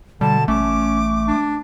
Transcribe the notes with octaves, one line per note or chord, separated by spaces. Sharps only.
B2 D3 G3 A5
A1 A3 C#4 D6
D4